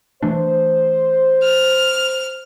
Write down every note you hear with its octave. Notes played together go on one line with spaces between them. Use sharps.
E3 A3 D4 C5
F6